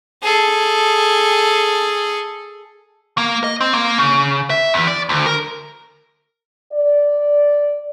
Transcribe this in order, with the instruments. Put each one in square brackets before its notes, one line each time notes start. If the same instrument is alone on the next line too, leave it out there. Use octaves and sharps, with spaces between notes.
[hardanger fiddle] G#4 A4
[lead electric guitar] A#3
D#5
C4
A#3
C#3
E5
E2
D5
D2
A#4
[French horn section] D5